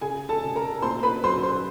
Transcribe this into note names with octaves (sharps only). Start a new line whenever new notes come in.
C#3 G#4 G#5
A4 A5
C#3
A#4 A#5
A#2 C5 C6
B4 B5
F#3 C5 C6
C5 C6